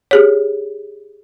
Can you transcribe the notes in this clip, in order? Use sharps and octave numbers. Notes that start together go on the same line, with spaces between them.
G4 G#4 C#5